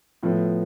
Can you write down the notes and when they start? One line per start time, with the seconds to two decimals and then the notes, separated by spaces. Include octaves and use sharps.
0.23 A2 F3 B3